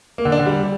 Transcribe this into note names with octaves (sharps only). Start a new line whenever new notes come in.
A#3
D3
D4
D3
G3